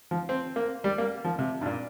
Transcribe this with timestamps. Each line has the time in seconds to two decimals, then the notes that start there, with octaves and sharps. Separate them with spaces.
0.11 F3
0.29 C4
0.56 A#3
0.84 G3
0.98 A#3
1.25 F3
1.39 C3
1.61 G2
1.66 A#2